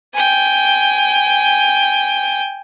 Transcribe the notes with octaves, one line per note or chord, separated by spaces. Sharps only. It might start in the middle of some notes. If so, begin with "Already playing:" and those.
G5 G#5